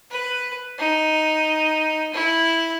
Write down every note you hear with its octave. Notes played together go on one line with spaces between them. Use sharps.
B4
D#4
E4